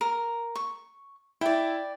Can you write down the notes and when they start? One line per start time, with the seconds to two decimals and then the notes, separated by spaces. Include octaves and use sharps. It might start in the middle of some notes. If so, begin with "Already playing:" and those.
0.01 A#4
0.56 C#6
1.41 E4 D5 E5 G5